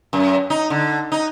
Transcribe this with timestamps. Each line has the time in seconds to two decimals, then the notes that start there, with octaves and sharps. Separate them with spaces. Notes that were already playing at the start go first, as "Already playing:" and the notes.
0.13 F#2
0.50 D#4
0.70 D3
1.12 D#4